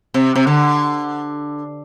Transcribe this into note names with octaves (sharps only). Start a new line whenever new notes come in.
C3
C3
D3